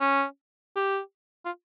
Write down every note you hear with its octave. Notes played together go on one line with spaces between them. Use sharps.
C#4
G4
F4